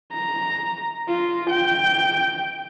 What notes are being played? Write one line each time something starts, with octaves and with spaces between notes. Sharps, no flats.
A#5
F4
G5